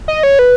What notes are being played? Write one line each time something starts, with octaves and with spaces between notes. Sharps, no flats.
D#5
C#5
B4